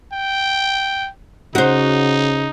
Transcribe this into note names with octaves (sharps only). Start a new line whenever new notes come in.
G5
C#3 D#4 F#4 C5